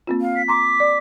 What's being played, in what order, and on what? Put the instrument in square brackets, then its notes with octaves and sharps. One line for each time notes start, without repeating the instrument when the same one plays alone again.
[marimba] A#3 C4 F4
[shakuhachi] F5
[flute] B6
[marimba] A#5 C6 [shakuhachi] D6
[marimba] D5